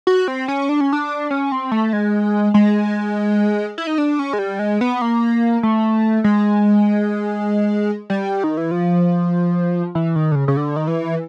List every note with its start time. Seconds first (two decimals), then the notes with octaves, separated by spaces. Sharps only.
0.07 F#4
0.28 C4
0.48 C#4
0.69 D4
0.81 C#4
0.93 D4
1.30 C#4
1.52 C4
1.71 A3
1.93 G#3
2.54 G#3
3.78 E4
3.87 D#4
3.98 D4
4.19 C#4
4.33 G#3
4.39 G3
4.59 G#3
4.81 B3
5.02 A#3
5.63 A3
6.24 G#3
8.10 G3
8.44 D#3
8.57 E3
8.71 F3
9.95 E3
10.16 D#3
10.32 D3
10.35 C#3
10.48 C#3
10.57 D3
10.76 D#3
10.87 E3